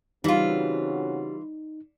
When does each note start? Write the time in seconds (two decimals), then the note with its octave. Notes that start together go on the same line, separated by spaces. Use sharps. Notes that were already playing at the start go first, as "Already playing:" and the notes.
0.24 C#3 E3 G3 C4 D#4 F4 F#4